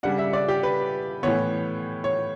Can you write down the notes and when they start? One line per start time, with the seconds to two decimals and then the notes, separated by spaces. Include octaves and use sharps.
0.03 C#3 G3 D4 F#5
0.18 E5
0.33 D5
0.48 G4
0.63 B4
1.23 A2 E3 B3 C#5
2.04 C#5